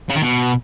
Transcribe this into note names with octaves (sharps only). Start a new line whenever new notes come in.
C#3
D#3
B2